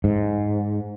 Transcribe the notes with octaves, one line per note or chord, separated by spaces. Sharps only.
G#2